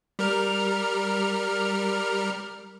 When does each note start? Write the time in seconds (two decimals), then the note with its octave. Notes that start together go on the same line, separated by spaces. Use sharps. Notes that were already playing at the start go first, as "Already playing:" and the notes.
0.19 G3 A#4 F6